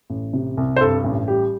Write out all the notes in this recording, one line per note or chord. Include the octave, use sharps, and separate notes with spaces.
A1
C3
C2
C5
G2 A4
A1
G3 G4